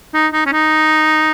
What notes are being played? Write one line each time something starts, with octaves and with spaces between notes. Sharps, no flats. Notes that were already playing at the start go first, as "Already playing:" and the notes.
D#4
D#4
C#4
D#4